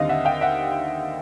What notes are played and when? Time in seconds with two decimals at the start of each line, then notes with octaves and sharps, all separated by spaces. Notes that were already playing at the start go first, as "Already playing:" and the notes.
Already playing: D#2 D3 G3 C4 D#5 F5
0.09 E5 F#5
0.25 F5 G5
0.41 E5 F#5